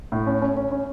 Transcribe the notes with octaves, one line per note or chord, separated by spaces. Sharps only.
A2
C#4
C#4
C#4
C#4